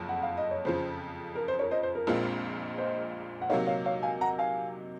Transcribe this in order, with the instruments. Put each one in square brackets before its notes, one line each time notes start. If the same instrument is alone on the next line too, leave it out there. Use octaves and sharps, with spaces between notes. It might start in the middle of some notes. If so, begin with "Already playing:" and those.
Already playing: [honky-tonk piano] F#1 F2
[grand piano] F#5
F5
D#5
C#5
[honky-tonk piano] F2 C#3 F3 [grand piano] C5
[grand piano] A#4
C5
A#4 C#5
C5 D#5
C5
A#4
[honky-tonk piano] A#1 A#2 G#3 C4 F4
[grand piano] C5 D#5
F#5
[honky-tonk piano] C3 F#3 A#3 D#4 [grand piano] C#5 F5
[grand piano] C#5 F5
C#5 F5
F5 G#5
F#5 A#5
F5 G#5